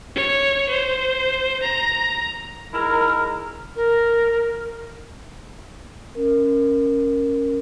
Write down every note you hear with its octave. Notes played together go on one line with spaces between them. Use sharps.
C#5
C5
A#5
G#3 D#4 E4 A#4
A#4
C#4 A#4